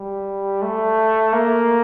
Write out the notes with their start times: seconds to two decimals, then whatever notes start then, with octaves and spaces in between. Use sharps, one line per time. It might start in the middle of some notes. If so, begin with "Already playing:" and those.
Already playing: G3
0.62 A3
1.33 A#3